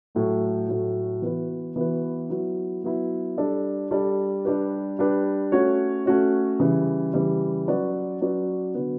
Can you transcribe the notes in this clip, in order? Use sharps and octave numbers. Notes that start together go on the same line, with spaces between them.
A2 F#3 A3
A2 F#3 A3
E3 B3 F#4 B4
E3 B3 F#4 B4
F#3 B3 E4
F#3 B3 E4
G3 D4 A4 D5
G3 D4 A4 D5
G3 D4 G4 B4
G3 D4 G4 B4
A3 C#4 F#4 C#5
A3 C#4 F#4 C#5
C#3 E3 G3
C#3 E3 G3
F#3 C#4 F#4 B4 D5
F#3 C#4 F#4 B4 D5
D3 F#3 B3